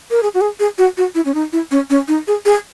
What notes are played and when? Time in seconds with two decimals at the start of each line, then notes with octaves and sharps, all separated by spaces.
0.11 A#4
0.23 G#4
0.34 F#4
0.41 G#4
0.60 G#4
0.78 F#4
0.98 F#4
1.15 E4
1.25 C#4
1.34 D#4
1.53 E4
1.71 C#4
1.90 C#4
2.08 D#4
2.28 G#4
2.46 G#4